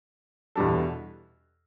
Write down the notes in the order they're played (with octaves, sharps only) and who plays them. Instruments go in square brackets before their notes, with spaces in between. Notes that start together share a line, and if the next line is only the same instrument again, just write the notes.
[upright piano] E2 B2 G3 D4 A4